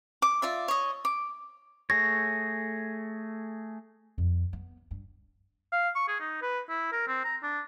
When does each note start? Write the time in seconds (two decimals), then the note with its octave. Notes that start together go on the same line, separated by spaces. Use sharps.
0.22 D6
0.42 F4 D5 E5
0.68 C#5 D#5
1.05 D6
1.90 A3 G#4 C#5 A#6
4.18 F2
4.53 B3
4.91 G2
5.72 F5
5.96 C#6
6.08 G#4
6.20 D#4
6.42 B4
6.69 E4
6.92 A#4
7.08 C4
7.25 A#5
7.43 D4